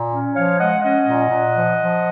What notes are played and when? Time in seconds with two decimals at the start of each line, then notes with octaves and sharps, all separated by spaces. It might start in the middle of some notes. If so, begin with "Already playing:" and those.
Already playing: A#2
0.13 C#4
0.35 F3 C#5 F5
0.59 G#3 D#5 F#5
0.83 C#4 D#5 F#5
1.07 A#2
1.30 A#2
1.55 F3
1.79 F3